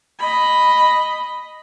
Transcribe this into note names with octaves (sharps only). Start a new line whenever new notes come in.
D#5 B5